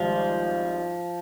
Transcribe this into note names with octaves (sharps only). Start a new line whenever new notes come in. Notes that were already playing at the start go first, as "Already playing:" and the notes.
Already playing: G#1 G#2 F3 G3 F4